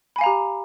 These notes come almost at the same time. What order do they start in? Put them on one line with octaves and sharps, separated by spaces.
B5 G#5 F5 A#5 G4